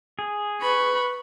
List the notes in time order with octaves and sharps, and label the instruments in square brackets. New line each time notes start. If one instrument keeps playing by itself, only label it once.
[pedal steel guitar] G#4
[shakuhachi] B4 [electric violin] B5 C#6